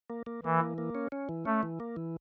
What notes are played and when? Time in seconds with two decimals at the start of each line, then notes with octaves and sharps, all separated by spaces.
0.10 A#3
0.26 A#3
0.44 E3 A#3
0.61 E3
0.78 A#3
0.95 C#4
1.12 C#4
1.29 E3
1.46 A3 C#4
1.63 E3
1.80 A#3
1.96 E3